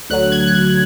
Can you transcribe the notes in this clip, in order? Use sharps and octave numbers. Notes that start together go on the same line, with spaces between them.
D2 D3 F#3 F#6
G#6
F#6
G#6